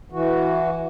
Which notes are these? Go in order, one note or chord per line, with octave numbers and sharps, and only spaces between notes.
E3 F#4